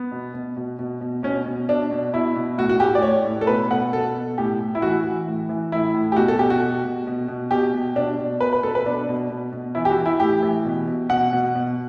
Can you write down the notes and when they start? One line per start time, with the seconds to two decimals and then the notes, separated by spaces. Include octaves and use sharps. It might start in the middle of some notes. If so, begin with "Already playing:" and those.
Already playing: B3
0.12 B2
0.34 B2
0.56 B2
0.79 B2
1.01 B2
1.23 B2 C#4
1.46 B2
1.68 B2 D4
1.91 B2
2.13 B2 E4
2.36 B2
2.58 A2 F#4
2.69 F#4
2.80 A2 G4
2.95 D5
3.02 A2 C#5
3.25 A2
3.41 A4
3.47 B2 B4
3.70 B2 F#5
3.93 B2 A4
4.15 B2
4.38 A2 G4
4.60 A2
4.75 E4
4.82 E3 F#4
5.05 E3
5.28 A2
5.49 E3
5.72 A2 E4
5.95 A2
6.12 G4
6.16 B2 F#4
6.28 A4
6.39 B2 G4
6.50 F#4
6.62 B2
6.84 B2
7.07 B2
7.28 B2
7.51 B2 G4
7.73 B2
7.96 B2 D4
8.19 B2
8.40 B2 B4
8.53 B4
8.63 B2 A4
8.75 B4
8.86 B2 D4
9.09 B2
9.30 B2
9.52 B2
9.75 E3 E4
9.85 G4
9.90 F#4
9.97 E3
10.06 E4
10.20 A2 G4
10.43 E3
10.65 B2
10.87 B2
11.09 B2 F#5
11.33 B2
11.55 B2